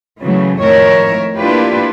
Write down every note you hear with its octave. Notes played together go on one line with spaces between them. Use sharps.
C#3 E3 F#3 A3
F2 A2 D#3 A#4 C#5 E5
A#3 D4 E4 F4 G4 B4